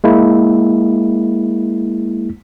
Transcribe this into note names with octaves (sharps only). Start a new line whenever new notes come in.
G#3 A#3 E4